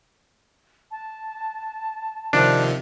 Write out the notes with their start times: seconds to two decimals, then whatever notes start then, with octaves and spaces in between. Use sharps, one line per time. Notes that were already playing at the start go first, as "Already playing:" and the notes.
0.91 A5
2.33 C3 D#3 F3 D4